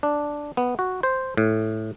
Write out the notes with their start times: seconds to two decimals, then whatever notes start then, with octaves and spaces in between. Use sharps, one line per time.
0.03 D4
0.57 B3
0.79 F#4
1.03 C5
1.37 A2